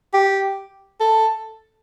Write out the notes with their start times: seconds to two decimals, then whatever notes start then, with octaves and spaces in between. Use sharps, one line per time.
0.13 G4
1.00 A4